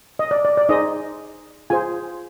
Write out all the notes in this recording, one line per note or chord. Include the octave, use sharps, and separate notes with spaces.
D#5
D5
D5
D5
D#4 G#4 C5 D#5
F4 G#4 C5 G#5